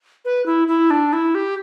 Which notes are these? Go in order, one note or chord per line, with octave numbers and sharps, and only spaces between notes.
B4
E4
E4
D4
E4
G4